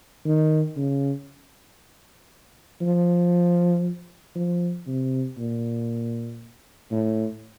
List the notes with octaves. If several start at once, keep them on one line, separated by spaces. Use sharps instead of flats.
D#3
C#3
F3
F3
C3
A#2
A2